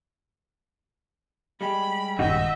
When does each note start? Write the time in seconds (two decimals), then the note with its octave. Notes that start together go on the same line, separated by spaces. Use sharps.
1.61 G3 G#3 G4 B5
2.19 D#1 G2 D#3 D#4 F#4 D#5 E5